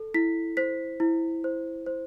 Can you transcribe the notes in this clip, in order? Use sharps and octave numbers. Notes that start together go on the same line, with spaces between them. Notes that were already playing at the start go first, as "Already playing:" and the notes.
Already playing: A4
E4 B6
C5 B6
E4
C5
C5